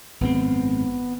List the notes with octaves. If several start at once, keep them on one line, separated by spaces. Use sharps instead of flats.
G#1 F#2 B3 C4